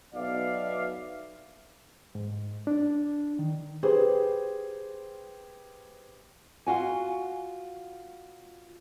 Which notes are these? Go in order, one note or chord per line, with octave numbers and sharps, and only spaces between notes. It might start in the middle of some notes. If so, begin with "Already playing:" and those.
B1 B2 D5 E5 F5
G#2
D4
D#3
G4 G#4 B4 C5
F4 F#4 G#5